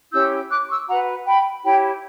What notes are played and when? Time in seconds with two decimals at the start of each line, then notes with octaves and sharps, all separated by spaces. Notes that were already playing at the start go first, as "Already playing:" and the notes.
0.12 C#4 E4 G4 E6 G6
0.50 D6 F#6
0.69 C#6 E6
0.88 F#4 B4 F#5 A#5
1.26 G5 B5
1.64 E4 G4 C#5 G5 B5